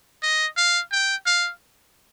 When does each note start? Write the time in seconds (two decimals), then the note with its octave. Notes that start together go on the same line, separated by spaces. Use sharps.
0.22 D#5
0.57 F5
0.92 G5
1.26 F5